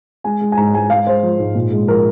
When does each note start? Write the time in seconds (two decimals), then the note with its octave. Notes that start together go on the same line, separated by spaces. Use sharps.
0.24 G#3 G#5
0.41 G#3
0.52 G#5
0.57 G#2 A#5
0.74 G#3 G#5
0.90 G#3 F5
1.07 G#3 C5
1.23 F3
1.39 G#2
1.55 A#2
1.72 G#3
1.88 F3 A#4